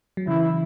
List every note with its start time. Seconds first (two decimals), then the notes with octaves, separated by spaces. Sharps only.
0.17 F#3
0.27 C#3 E3 E4